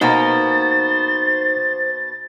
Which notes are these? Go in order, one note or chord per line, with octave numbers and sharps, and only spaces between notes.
B2 A#3 B3 D#4 C5 A#5 A6